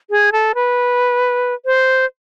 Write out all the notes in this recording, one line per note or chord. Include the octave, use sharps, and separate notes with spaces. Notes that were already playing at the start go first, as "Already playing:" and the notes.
G#4
A4
B4
C5